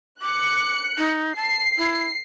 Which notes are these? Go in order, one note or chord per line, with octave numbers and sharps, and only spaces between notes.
D6 F#6 C#7
D#4
A5 C7
E4